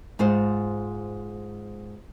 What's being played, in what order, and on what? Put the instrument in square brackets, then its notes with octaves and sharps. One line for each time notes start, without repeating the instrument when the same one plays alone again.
[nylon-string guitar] G#2 F4 C5